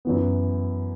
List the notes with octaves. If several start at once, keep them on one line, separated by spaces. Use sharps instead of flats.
F#2 E3 B3